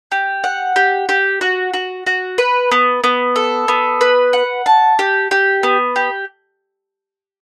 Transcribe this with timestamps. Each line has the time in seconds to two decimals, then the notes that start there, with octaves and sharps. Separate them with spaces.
0.12 G4
0.44 F#5
0.76 G4
1.09 G4
1.41 F#4
1.74 F#4
2.06 F#4
2.38 B4
2.71 B3
3.04 B3
3.36 A4
3.68 B3
4.01 B4
4.33 F#5
4.66 A5
4.99 G4
5.31 G4
5.63 B3
5.96 G4